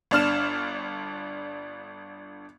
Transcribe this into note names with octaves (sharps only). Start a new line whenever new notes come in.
G1 D4 F6 E7